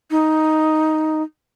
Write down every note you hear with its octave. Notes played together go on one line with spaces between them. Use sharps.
D#4